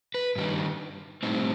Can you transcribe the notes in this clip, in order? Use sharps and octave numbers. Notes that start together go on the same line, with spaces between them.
B4
G2 D#3 G3 D#4
A2 G3 C4 D#4